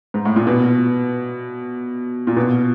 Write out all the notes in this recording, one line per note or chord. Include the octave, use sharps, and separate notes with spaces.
G#2
A2
A#2
B2
A#2
B2